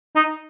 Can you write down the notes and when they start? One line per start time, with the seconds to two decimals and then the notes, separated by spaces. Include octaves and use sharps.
0.16 D#4